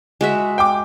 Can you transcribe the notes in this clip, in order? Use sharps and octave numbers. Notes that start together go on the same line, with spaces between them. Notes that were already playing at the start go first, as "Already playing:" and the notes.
G#3 F#4 E5
G5 D6